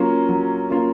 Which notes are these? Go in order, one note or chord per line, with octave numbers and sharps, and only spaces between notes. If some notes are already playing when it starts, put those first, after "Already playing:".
Already playing: F#3 A#3 C#4 F4
F#3
A#3 C#4 F4